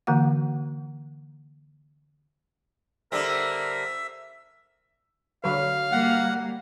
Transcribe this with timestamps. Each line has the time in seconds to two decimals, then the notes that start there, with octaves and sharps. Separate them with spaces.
0.07 D3 E3 A#3 F#4 F#5
3.12 D3 G3 C4 A#4 E5
5.44 D3 F#3 B4 F5
5.92 G3 A#3 F#5